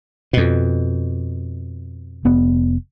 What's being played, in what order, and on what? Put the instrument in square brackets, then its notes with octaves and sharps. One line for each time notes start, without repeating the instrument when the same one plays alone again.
[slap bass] F2 B2
[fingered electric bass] F1 B3